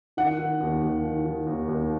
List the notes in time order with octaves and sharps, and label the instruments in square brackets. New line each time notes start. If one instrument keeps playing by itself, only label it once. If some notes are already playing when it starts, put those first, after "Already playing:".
[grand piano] D#3 F#5
D#3
D#2
D#2
D#3
D#3
D#2
D#2